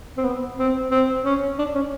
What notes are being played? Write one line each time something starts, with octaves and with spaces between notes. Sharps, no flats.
C4
B3
C4
C4
C#4
D4
C#4